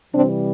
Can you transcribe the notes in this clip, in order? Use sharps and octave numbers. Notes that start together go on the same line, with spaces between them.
C3 E3 G3 C4 D4